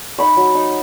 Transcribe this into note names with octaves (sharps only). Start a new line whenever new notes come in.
D#4 B5 C#6
F#3
D#4